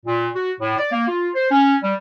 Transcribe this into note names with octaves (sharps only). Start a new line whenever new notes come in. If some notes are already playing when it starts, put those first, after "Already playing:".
A#2
F#4
A2
D5
A#3
F4
C5
C#4
G3